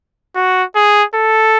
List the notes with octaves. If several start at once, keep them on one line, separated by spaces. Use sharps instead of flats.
F#4
G#4
A4